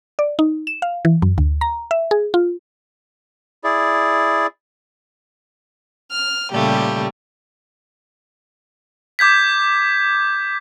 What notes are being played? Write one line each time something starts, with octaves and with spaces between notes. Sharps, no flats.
D5
D#4
E7
F5
E3
F#2
D2
A#5
E5
G#4
F4
E4 G#4 D5
F6
A#2 C#3 G3 A3 G4
D6 G6 G#6 B6